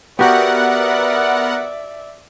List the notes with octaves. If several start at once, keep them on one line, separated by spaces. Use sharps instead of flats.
B3 F#4 G4 A#4 D5 E5 F#5